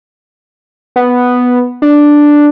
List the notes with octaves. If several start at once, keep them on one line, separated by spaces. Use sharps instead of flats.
B3
D4